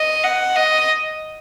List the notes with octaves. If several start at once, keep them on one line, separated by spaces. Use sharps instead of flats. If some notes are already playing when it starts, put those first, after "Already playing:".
Already playing: D#5
F#5
D#5